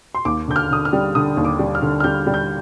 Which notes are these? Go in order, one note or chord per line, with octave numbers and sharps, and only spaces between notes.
C6
D#2 D6
D3 G6
F6
D3 D#6
F6
G3
D3 D#6
D#2
D6
G3
F6
D3
F6
G3 G6
G3
G6